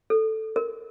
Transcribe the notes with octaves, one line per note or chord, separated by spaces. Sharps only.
A4
A#4